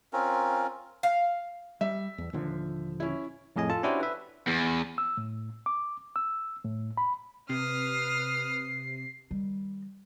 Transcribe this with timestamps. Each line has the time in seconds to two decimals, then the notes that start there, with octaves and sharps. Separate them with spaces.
0.13 C4 C#4 F4 A#4
1.03 F5
1.81 G3 E5
2.18 E2
2.33 D#1 D3 F3
3.00 C#4 E4
3.56 F2 A2 G#4 D#5 G#5
3.70 F4 A4 A5
3.83 C#4 D4 E4 F#4 G4 C5
4.00 B4 E5
4.47 E2
4.98 E6
5.17 A2
5.66 D6
6.16 E6
6.64 A2
6.97 B5
7.49 C3 B4 D#6 F6 C7
9.31 D#3 G3